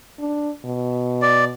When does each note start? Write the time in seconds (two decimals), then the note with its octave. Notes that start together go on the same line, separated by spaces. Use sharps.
0.20 D4
0.65 B2
1.22 D5